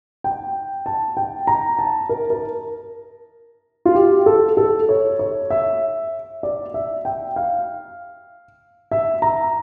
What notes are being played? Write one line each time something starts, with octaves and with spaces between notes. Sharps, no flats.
G5
A5
G5
A#5
A5
A#4
A#4
F4
G4
A4
A4
C#5
C#5
E5
D5
E5
G5
F5
E5
A#5